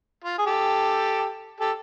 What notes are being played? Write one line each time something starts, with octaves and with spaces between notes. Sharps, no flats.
F4
G#4
G4 A4
G4 A4